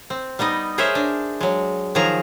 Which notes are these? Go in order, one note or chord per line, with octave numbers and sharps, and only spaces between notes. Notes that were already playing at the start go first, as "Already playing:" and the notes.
C4
G3 B3 D#4 D#5
G#4 A#4 C5 C#5 D#5 E5
D4
F#3 G#3
D#3 F3 F#3 G#4 A#5